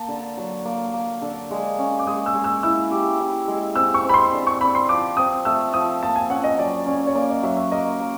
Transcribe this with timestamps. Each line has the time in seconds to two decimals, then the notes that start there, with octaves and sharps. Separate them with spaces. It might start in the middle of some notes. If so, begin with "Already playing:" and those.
Already playing: A#3 A5
0.08 D3
0.37 F#3
0.65 A#3
0.93 A#3
1.22 D3
1.51 G#3
1.79 C#4
1.99 D6
2.07 G#3 D#6
2.26 E6
2.35 G#3
2.44 E6
2.63 E4 E6
2.91 G4
3.20 E4
3.48 G#3
3.75 C4 E6
3.94 C#6
4.04 C4
4.09 B5
4.14 C6
4.33 D3
4.47 C#6
4.60 C4 B5
4.75 C6
4.89 F3 D6
5.17 C4 D#6
5.45 A3 E6
5.74 F3 D#6
6.03 A#3 A5
6.16 G#5
6.30 C#4 F#5
6.44 D#5
6.58 F#3 D5
6.86 C#4 D5
7.07 C#5
7.15 A#3 D5
7.30 D#5
7.43 F#3 E5
7.57 E5
7.72 A#3 D#5
8.00 A#3